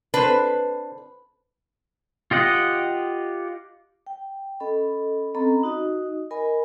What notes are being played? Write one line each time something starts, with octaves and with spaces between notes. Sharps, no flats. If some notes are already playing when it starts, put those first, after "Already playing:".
D4 B4 C5
F4 G4 D#5 F#5
G5
C#4 A4 D#5 B5
C4 C#4 A4 D#5 A#5 B5
D#4 F#4 D#5
A#4 D#5 G#5 B5